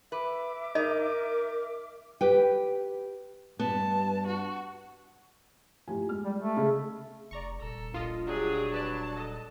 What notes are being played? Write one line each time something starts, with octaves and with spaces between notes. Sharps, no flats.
B4 E5 D6
D#4 A#4 D#5
G4 B4 G5
G2 B3 A5
F#4
A2 F3 G4 G#5
G#3 F6
G3
A3
C#3 D#5
F1 D5 A#5 C#6
D#1 A4 A#5
A#1 F4 D#5
F#3 D4 G4 G#4
B4 D5 A5
A4 D#5